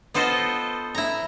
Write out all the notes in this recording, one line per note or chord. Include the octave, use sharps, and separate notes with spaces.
B3 F4 A4 C5 D#5
E4 A#5